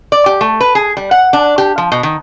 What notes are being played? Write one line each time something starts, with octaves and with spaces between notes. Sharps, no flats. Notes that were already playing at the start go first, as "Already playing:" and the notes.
D5
G4
A3
B4
G#4
G3
F#5
D4
G4
F3
B2
D#3